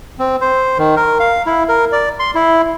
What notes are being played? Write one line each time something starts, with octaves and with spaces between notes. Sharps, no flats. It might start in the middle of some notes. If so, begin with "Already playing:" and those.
C4
C5
D#3
A#4
F5
E4
A#4
D5
C6
E4